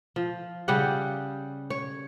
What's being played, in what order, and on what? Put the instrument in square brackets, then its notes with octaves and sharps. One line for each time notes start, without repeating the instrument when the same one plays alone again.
[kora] F3
C#3 G3 G4 F#5
C#5